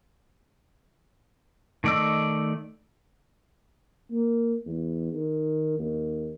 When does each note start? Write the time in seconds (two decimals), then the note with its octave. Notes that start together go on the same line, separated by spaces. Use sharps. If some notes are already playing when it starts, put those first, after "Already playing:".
1.84 D#3 A3 D5 D#5 E6
4.11 A#3
4.66 E2
5.14 D#3
5.79 D#2